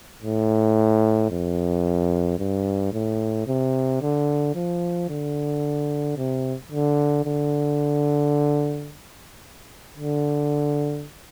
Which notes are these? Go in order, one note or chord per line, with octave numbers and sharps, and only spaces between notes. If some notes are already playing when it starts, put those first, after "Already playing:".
A2
F2
G2
A2
C3
D3
F3
D3
C3
D3
D3
D3